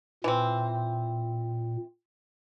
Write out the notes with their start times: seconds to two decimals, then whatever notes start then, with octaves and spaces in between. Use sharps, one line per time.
0.24 A#2 E3 C4